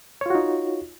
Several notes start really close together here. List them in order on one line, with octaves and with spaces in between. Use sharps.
C#5 F4 F#4 D#4